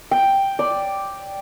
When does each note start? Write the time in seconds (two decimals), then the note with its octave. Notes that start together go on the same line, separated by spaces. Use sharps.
0.11 G5
0.59 D5